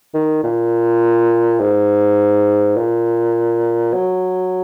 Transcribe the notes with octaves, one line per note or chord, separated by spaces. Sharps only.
D#3
A#2
G#2
A#2
F#3